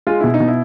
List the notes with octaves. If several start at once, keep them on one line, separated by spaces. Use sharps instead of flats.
G#3 F4
B2 E4
D#4
B2
E4